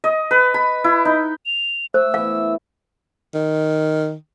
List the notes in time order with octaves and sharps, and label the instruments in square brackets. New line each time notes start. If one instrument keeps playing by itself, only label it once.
[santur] D#5
B4
B5
E4
D#4
[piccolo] F7
[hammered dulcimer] A3 [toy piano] C5 [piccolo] E6
[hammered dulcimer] E3 B3 [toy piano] F5
[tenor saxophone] D#3